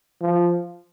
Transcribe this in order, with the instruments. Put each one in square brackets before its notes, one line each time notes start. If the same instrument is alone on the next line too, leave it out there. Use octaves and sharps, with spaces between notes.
[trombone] F3